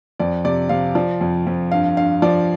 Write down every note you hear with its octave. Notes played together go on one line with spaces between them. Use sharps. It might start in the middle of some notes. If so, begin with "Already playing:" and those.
F2 D5
C3 D5
C3 F5
F3 D5
F2
F2
G2 F5
G2 F5
F3 D5